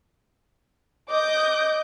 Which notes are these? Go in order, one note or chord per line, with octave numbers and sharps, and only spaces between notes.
D#5 D6 G6